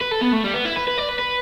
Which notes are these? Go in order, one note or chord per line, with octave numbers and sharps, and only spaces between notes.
B4
A4
B3
A3
G3
B3
E4
B4
B4
D5
B4
B4